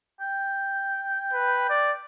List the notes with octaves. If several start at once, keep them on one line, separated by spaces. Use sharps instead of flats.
G5
B4
D5